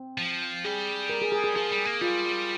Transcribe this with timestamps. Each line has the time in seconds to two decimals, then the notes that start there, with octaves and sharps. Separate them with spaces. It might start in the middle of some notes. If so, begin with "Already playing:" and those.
Already playing: C4
0.18 F3
0.65 G3 G#4
1.09 A#4
1.22 G#4
1.32 G#4
1.44 G#4
1.55 F3 G#4
1.71 G3
1.85 A#3
2.01 G3 F4